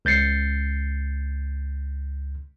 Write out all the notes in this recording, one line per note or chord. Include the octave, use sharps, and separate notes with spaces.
C#2 G6 A6 C7 C#7